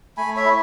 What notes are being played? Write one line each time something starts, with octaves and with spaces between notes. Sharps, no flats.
A3 G#5 B5
C#5 E5
E4